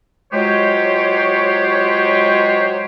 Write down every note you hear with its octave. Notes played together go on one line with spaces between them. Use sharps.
F#3 G#3 F4 G4 C5 C#5